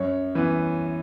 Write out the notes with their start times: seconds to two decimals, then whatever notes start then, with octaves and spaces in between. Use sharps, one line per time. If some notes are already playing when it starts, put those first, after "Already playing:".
Already playing: F#2 C#5
0.35 E3 B3